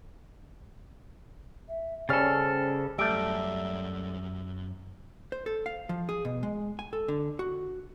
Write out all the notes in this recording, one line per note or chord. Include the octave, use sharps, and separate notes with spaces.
E5
C#3 G3 C#4 A4 C5 F6 A6
F#2 G3 A3 E5 E6 D7
C5
A4
F5
F3
G#4
B2
G#3
G#5
A4
D3
F#4